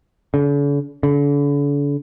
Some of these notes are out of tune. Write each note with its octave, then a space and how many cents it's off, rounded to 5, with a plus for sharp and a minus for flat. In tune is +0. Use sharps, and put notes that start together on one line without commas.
D3 -45
D3 -40